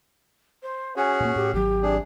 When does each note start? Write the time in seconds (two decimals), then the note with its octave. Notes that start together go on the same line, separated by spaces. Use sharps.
0.63 C5
0.97 C#4 F#4 G#4 G#5
1.20 A#2 A#3
1.36 A2 G4
1.53 G#1 F#3 G4
1.83 C3 D4 G#4